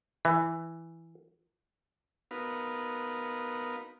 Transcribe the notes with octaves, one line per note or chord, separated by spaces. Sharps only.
E3
B3 D#4 F#4 A#4 B4 F5